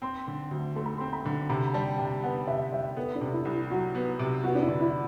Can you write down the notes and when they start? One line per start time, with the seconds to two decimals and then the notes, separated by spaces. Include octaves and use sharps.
0.02 C4 C6
0.27 D3
0.51 D2
0.76 A3 C6
0.86 B5
0.97 C4 C6
1.13 B5
1.25 D3
1.49 C3 B5
1.68 B5
1.74 G3 A5
1.98 C3 G5
2.23 B3 F#5
2.47 C3 E5
2.72 G3 E5
2.96 B3 A4
3.15 D4
3.21 C3
3.33 E4
3.45 C2
3.52 E4
3.70 F#3 F#4
3.95 B3
4.19 C3
4.44 B3 F#4
4.55 D4
4.62 E4
4.68 D3
4.81 E4